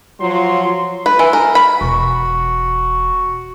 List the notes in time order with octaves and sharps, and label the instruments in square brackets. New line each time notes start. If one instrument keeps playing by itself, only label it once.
[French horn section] F3 F#3 [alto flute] F4 [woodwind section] C6
[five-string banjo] B4
E3
A#4
B5
[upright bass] E1 [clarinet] F#4